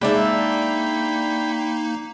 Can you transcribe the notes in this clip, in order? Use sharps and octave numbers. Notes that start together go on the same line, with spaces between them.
G#3 A#3 D4 D#4 D5 E5 G5 B5